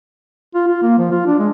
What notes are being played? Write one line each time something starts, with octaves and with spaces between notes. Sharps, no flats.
F4
F4
A#3
F3
F4
D4
G#3